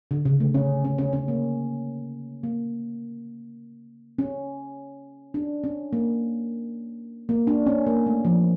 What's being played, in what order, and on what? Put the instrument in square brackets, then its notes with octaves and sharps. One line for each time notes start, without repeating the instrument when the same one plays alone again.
[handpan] D3
C#3
A3
C#4
C#4
C#4
C#4
A#3
A#3
C#4
D4
C#4
A#3
A#3
D4
C#4
A#3
A3
F3